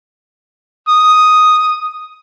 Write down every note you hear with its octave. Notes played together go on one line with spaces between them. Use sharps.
D#6